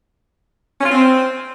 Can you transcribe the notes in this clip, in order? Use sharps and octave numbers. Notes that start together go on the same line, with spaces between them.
C#4
F4
C4